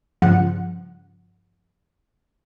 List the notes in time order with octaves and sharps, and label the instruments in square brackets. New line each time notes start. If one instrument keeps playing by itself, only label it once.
[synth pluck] G2 C#3 F3 F#5